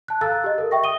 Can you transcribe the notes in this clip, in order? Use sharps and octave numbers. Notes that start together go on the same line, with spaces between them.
A5 F#6
A4 F5 A#5 E6 F#6 A6
G4 D#5
A4 A#4
E5 G5 C#6 A#6
D#6 D#7 G7